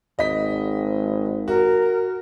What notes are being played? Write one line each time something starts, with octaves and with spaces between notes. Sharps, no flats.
G#1 D#5 B6
F#4 A#4